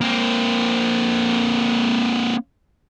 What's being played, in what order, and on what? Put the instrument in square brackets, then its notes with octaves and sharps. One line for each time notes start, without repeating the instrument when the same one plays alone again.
[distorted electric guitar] A#3 C4